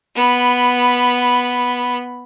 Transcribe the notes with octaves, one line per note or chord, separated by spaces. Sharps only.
B3 B5